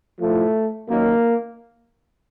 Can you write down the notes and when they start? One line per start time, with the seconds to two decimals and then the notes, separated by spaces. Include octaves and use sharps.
0.20 A2 F3 A3
0.88 F#2 D#3 F#3 A#3